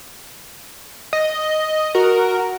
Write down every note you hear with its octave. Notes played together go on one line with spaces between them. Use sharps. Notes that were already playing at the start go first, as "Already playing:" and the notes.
D#5
F#4 A#4